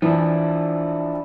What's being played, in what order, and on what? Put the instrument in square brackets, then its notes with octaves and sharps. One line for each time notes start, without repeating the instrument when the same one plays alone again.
[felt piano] E3 [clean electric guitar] F3 D4 E4